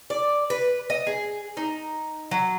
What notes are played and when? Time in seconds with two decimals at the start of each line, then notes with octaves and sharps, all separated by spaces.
0.10 D5
0.50 B4
0.90 D#5
1.07 G#4
1.57 D#4
2.31 F#3